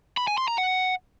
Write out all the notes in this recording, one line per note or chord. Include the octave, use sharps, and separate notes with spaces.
B5
G#5
C6
A#5
F#5